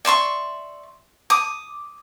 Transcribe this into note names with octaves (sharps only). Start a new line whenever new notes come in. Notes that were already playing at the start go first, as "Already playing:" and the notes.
D5 E5 C6 C#6
D6 D#6